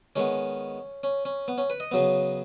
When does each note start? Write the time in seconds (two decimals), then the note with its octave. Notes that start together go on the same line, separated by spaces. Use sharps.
0.16 D#3 G#3 B3 C#4
1.04 C#4
1.25 C#4
1.48 B3
1.58 C#4
1.70 B4
1.80 D#5
1.91 C#3 F#3 B3